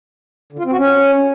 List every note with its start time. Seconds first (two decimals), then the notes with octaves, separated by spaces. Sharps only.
0.53 D3
0.59 F4
0.65 C4
0.72 F#4
0.78 C#4